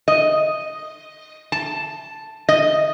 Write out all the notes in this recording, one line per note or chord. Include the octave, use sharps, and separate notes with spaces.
D#5
A5
D#5